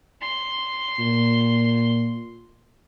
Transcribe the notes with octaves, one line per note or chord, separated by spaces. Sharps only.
C6
A#2